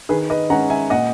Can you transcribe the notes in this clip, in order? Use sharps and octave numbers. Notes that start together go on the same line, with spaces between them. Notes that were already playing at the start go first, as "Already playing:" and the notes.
D#3 G#4 B4
B4 D#5
G#3 C#4 F#5 A#5
E5 G#5
A#2 D#5 F#5